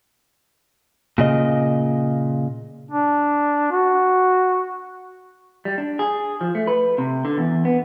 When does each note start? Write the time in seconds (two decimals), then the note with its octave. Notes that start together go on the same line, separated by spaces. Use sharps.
1.18 A#2 C#3 D#5
2.91 D4
3.72 F#4
5.65 G3
5.78 D4
5.99 G#4
6.41 F3
6.55 A3
6.67 B4
6.98 C3
7.25 D3
7.38 E2
7.65 B3